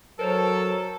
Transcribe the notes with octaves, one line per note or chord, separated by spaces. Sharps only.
F#3 A4 A#4 C5 C#5